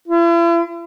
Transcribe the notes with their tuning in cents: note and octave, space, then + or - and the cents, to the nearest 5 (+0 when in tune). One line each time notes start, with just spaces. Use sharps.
E4 +45